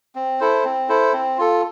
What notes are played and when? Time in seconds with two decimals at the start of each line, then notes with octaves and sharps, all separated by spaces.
0.15 C4
0.40 E4 A4 C5
0.65 C4
0.89 E4 A4 C5
1.13 C4
1.38 F4 A4